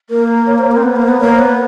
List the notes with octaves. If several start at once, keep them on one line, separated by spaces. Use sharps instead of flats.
A#3 A#4
C#5
C5
A#4
C4
B3 B4
A#3
C5
B3
A#3 C#5
C5
B3
B4